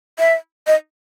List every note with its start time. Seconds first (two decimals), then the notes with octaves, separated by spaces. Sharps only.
0.19 E5
0.67 D#5